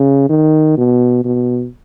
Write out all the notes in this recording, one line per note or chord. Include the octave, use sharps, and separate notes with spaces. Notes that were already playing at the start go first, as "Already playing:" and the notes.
Already playing: C#3
D#3
B2
B2